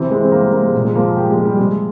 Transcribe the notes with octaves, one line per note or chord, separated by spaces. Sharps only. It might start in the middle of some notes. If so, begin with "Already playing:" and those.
Already playing: C3 E3 C4
E3 G#3
C4
C3 A#3
G#3
C3 A#3
G#3
A#2
G#3
F3 A#3
G#4
A#2 G4
G#3
F3
G3
C3 G#3